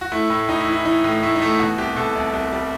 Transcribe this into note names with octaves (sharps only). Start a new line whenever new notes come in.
F#4
A3 E4
A2 E4
A2 D#4
E4
E3
E4
E3 D#4
A2
A3 E4
D#4
A3
E4
B2 F#4
C2 G4
B2 A4
C2
C2
G3